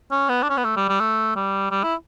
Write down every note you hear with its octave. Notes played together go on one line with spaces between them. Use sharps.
C#4
B3
D4
C#4
B3
A3
G3
G3
A3
G3
G3
E4